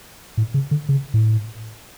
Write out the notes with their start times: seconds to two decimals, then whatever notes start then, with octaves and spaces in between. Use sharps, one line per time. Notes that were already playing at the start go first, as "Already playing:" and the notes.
0.37 A2
0.54 C#3
0.71 D3
0.89 C#3
1.14 A2